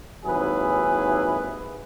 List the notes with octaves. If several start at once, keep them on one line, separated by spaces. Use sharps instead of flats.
G#1 D#2 F#3 E4 G#4 B4